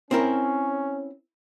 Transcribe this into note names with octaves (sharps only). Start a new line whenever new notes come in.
C4 C#4 E4 A#4